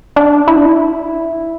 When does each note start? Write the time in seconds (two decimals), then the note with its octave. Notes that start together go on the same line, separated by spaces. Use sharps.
0.16 D4
0.48 E4
0.56 D4
0.66 E4